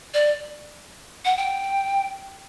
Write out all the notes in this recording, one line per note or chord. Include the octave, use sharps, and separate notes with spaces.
D5
F#5
G5